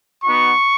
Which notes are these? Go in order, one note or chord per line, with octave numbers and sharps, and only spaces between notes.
B3 D#4 F#4 C#6